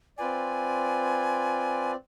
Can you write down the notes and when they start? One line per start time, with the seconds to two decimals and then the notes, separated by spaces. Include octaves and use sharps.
0.18 C4 F4 B4 D5 G#5